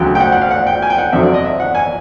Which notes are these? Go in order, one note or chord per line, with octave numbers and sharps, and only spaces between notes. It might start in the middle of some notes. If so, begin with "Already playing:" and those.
Already playing: D2 C#3 F#3 G5
G5
F#5
F#5
F5
F#5
G5
G#5
G5
F#5
F2 D3 F#3 E5
D5
D#5
E5
F#5
G#5